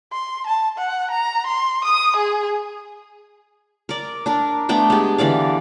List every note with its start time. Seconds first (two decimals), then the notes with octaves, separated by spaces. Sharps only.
0.13 C6
0.47 A5
0.78 F#5
1.11 A#5
1.47 C6
1.85 D#6
2.17 G#4
3.89 A#4 D5
4.26 D4 A#4
4.69 A3 B3 D4 G5
4.90 G#3 G4
5.18 D3 E3 D5 F5